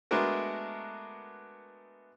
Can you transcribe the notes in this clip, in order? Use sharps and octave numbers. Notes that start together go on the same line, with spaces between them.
G#3 A3 B3 D4 F#4 A#4